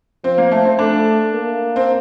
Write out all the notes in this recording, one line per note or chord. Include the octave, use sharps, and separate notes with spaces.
F3 C4
A#3
A3
C4
A3 D4
A#3
C4